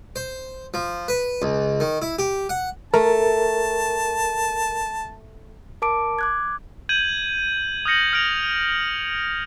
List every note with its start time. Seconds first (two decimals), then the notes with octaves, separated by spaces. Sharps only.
0.16 C5
0.74 F3
1.08 B4
1.42 C#2
1.80 D#3
2.02 E4
2.19 G4
2.49 F#5
2.94 A3 A#4 A5
5.82 A#4 A5 D6 D7
6.19 D6 F#6 G#6
6.89 G6 G#6 D#7 F#7
7.85 D#6 F6 G6 A#6 C#7 F#7
8.13 F6 A#6 D7 F7